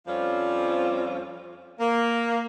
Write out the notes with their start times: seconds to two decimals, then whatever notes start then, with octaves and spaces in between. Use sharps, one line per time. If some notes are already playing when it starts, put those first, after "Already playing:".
0.07 F2 F3 G3 C4 C#4 F4
1.79 A#3